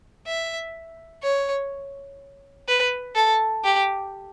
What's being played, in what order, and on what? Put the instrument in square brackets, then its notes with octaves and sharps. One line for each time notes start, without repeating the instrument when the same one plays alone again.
[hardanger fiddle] E5
C#5
B4
A4
G4